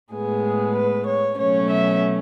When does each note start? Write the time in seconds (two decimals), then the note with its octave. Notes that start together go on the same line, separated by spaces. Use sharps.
0.12 A2 G#3 B3 G#4
0.76 B4
1.06 C#5
1.38 B2 F#3 A3 C#4 C#5
1.70 E5